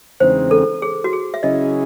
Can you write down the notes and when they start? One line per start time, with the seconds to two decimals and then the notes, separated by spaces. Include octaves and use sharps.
0.20 E2 C#3 G#3 C4 D#4 C5
0.51 A4
0.82 G#4
1.04 F#4
1.13 G#4
1.34 E5
1.43 C#3 F#3 C#4 E4 G#4 D#5